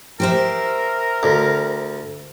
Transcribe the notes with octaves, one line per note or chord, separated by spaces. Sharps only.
G4 A#4 C5 E5
D2